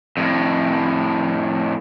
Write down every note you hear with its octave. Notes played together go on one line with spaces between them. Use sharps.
F2 A2